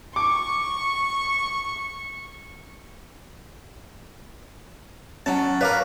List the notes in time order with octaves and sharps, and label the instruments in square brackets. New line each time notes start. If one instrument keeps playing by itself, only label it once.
[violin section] C#6 [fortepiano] D6
[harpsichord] F#3 A5 [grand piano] C#4
[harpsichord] A#4 B4 [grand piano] C#5 F5 D6